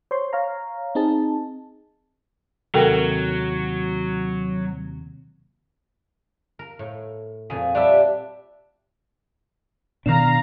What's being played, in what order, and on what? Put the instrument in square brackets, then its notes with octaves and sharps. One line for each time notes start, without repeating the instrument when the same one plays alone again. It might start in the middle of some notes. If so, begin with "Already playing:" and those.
[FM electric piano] C5 C#5 C6
C#5 F5 A#5
C4 D#4 G#4 A5
[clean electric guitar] D#2 C3 F#4 [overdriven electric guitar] F#3 [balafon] A4 A#4 G5
[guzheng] A#4
A2
[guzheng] F2 A#2 [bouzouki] G#4
[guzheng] G3 [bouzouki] D4 G4 E5
[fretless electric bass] B2 D4 [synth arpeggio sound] D#3 E7 [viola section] F5 A#5